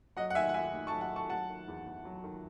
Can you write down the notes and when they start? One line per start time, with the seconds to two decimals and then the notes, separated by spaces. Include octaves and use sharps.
0.16 F#3 D#5 F#5
0.30 F#5
0.35 D#3 E5 G#5
0.49 F#5
0.54 D#2 E5 G#5
0.73 D#2
0.87 A5 C#6
0.92 F#3
1.01 F#5 A5
1.11 D#3 A5 C#6
1.29 F#3 F#5 A5
1.49 D#3
1.68 E2
1.87 E2
2.05 F#3
2.24 D#3